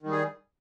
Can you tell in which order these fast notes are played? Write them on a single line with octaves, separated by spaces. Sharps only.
D#3 G3 G#4